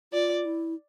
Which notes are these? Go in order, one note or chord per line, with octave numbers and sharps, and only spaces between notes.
F4 D5
E4